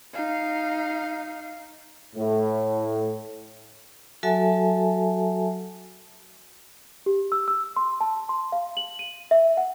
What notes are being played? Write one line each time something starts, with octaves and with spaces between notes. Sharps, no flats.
D#4 F5
A2
F#3 F#4 A4 E5 G#5 A5
G4
E6
E6
C6
A5
C6
F5
F#7
D#7
E5
F#5